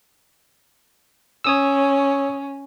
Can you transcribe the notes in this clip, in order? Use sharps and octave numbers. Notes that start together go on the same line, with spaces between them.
C#4 C#5 D#6 E6